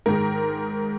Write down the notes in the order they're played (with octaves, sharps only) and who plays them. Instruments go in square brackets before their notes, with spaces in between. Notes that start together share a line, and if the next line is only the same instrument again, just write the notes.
[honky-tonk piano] G#2 D#3 G#3 A#4